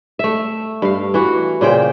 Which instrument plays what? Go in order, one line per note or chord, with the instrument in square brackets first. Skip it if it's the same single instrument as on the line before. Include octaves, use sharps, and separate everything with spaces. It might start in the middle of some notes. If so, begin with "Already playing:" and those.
[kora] A3 E5
G2 F5
E3 F#4
A#2 C#3 C5 G5